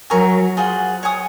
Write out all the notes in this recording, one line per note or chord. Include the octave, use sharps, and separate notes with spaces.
F#3 A#4 C#5 G#5 C#6
F4 G#4 C5 F#5
C#5 G#5 D#6